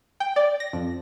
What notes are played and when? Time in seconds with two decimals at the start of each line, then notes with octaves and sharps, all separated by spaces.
0.20 G5
0.36 D5
0.60 A#6
0.73 F2